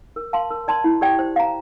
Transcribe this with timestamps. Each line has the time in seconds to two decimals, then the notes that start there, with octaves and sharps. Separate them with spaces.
0.16 A#4
0.33 F5 A5 C6
0.51 A#4
0.68 D5 A5 C6
0.84 E4
1.01 G4 D5 G5
1.19 C5
1.36 F5 A#5